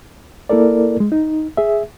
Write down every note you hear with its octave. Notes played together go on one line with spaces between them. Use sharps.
A#3 E4 A4 A#4 D5
G#3
D#4
G#4 E5